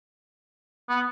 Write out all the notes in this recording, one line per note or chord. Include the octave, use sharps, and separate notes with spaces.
B3